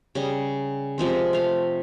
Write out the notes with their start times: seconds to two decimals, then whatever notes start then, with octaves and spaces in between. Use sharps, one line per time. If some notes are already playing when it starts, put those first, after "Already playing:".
0.15 C#3 G3 D#5
0.98 C3 F3 G#3 C4
1.33 A3 F5